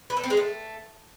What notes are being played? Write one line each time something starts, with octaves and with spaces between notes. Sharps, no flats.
B4
A4
C4
G#3
A3